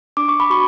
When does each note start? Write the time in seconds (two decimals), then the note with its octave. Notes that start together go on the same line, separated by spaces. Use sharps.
0.17 D4 D6
0.28 C#6
0.40 B5
0.50 F#4 C#6